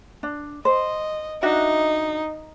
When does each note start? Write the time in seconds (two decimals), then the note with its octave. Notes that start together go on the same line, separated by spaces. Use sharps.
0.23 D4
0.65 C5 D#5
1.42 D4 D#4 F#4 E5